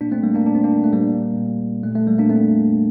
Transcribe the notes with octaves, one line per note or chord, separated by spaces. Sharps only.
A#2 A#3 D4
A3 C4
G3 A#3
A#3 D4
A#2 D4
C4
A#3 D4
A3
A#2 G3 A#3
A#2
A#2 A3
A3
G3 A#3
A#3 D4
A#2 A3 C4